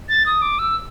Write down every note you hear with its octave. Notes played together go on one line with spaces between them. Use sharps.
A6
D#6
D6
E6